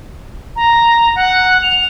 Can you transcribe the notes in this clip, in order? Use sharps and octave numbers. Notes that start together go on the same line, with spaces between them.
A#5
F#5
F7